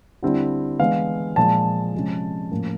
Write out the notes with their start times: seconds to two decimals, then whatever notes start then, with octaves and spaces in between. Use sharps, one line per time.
0.23 D3 G3 C4 E4
0.79 E3 G#3 B3 D4 F5
1.36 A#2 F3 G#3 A5
1.94 C3 F3 G#3 C#4
2.51 A2 F3 A#3 C#4